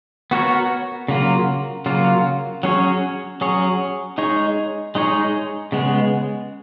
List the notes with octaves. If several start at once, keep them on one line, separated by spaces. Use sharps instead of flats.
B3 F#4 A#4 C#5
C#3 F#3 A#3 F4
C#3 F#3 A#3 F4
F#3 C#4 G#4 C#5
F#3 C#4 G#4 C#5
G#3 D#4 G#4 C#5
G#3 D#4 G#4 C#5
C#3 G#3 B3